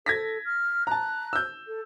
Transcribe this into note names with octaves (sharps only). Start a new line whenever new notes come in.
A4 G#6 A#6 B6
F6
A5 A#5 F#6
E6 G6
A4